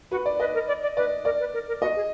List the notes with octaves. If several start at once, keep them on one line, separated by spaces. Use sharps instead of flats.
F#4 B4
D5
B4 D#5
A#4
D5
D5
B4 D5
A#4 D5
B4
A#4
A#4
F#4 D#5
G#4